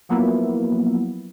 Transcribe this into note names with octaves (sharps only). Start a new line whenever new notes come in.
F3 F#3 A#3 B3 E4